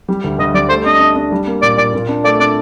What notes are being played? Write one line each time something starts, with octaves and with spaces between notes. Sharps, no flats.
G3
D2
D2 D#5
G3 D5
A3 C5
D4 D#5
D4
D4
G3
A#3
A#2 D5
A#2 D5
A#2
D4
A3 D5
D4 D5